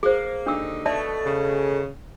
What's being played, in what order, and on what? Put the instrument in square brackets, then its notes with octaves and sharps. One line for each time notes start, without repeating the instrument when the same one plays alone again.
[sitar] A#3 [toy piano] G#4 C5
[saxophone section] D#2 D3 D#4 [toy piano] D4 E6
[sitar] B2 A3 [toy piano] D5 E5 A5
[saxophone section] C#3